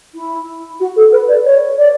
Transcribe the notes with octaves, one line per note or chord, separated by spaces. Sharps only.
E4
F#4
A4
B4
D5
C#5
D5